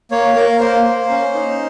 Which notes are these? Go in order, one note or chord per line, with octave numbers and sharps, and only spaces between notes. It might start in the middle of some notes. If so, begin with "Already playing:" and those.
A#3 C#5
A#3 A#4
A#3 C5
A#3
C#4
D#4